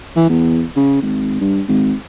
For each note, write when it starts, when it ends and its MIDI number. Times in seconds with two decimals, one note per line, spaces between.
0.16 0.28 52
0.29 0.63 40
0.76 0.97 49
1.02 1.39 32
1.41 1.62 43
1.68 1.93 32